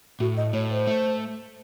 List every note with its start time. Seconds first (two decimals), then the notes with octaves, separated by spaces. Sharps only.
0.20 A2 F#4
0.37 D#5
0.53 A2 C#5
0.70 C5
0.87 A3